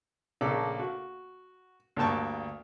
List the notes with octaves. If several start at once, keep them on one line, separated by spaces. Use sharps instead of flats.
A#1 C#3 A#3 A4 D5 D6
F#4
D2 G2 A#3 G5 A5 C#6